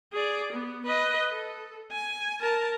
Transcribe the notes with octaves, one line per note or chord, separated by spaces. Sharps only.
G#4 D5
B3
B4 D#5
A4
G#5
A#4 A5